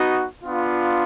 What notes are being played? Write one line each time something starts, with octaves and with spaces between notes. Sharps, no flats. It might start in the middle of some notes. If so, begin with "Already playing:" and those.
Already playing: B3 D#4 F#4
B3 D4 F4